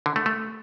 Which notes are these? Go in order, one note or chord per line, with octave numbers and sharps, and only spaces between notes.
D3
A3
A3